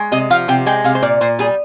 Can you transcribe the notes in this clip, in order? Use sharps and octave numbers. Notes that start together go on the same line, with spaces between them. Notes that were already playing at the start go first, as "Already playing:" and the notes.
Already playing: G#3
C3 D#5
F3 F5
C3 G5
G#3 G5
C3 F5
C5
A#2 D5
A#2 C5
G3 G#4